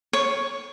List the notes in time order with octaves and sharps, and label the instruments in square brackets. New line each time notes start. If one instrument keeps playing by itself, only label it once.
[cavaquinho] C#5